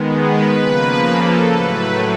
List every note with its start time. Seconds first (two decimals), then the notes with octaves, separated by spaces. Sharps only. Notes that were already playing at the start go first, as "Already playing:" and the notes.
Already playing: D#3 G#3 B3
0.15 B4
0.62 C#3 F3 A#3
1.07 A4
1.53 A2 F#3 A3 B4